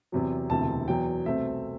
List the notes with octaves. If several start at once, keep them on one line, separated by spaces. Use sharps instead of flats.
E2 C3 F#3
E1 D2 C3 E3 A5
E2 B2 F#3 G5
C2 B2 A3 C4 E5